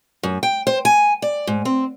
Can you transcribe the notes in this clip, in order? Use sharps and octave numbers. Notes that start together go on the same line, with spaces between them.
F#2
G5
C5
G#5
D5
G#2
C4